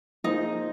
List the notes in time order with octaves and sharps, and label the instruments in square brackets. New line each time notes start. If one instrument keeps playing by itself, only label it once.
[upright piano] F3 A#3 F4 G#4 C5 [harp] D#4